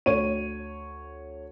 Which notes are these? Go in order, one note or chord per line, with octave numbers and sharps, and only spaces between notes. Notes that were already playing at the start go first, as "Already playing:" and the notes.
D2 C#5 D#7